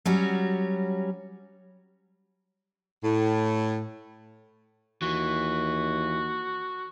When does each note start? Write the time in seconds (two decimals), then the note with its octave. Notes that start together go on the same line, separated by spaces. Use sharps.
0.05 F#3 G3 C#4 F#4
3.03 A2
5.02 D#2 E3 F#4